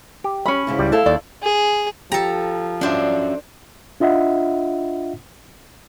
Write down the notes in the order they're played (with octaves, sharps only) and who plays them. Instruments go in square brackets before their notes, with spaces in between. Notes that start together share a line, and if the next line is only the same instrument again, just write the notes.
[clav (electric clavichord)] G4
[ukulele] C#4 B5
[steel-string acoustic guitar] G#2 C#3 E4
[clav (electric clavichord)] C#2 G3 D5
[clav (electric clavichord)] A3 [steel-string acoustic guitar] E4 A4 F5
[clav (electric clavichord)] D#2 [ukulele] D5
[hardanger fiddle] G#4
[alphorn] F3 [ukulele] G4 [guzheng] A4 A#5
[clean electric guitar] C#4 F#4 E5 [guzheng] D4 C5
[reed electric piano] D4 F4 D#5 E5 F#5